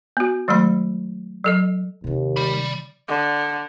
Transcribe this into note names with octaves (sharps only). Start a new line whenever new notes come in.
B3 F#4
D#3 F#3 G#3 A3 B5
F#3 A4 D#5
D#2 C3 D#3
D5 B5
D3